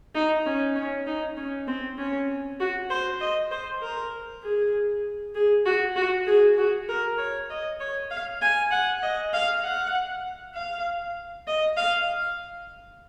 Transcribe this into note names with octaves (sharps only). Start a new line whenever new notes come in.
D#4
C#4
C#4
D#4
C#4
C4
C#4
F#4
C5
D#5
C5
A#4
G#4
G#4
F#4
F#4
G#4
F#4
A#4
C#5
D#5
C#5
F5
G#5
F#5
D#5
F5
F#5
F5
D#5
F5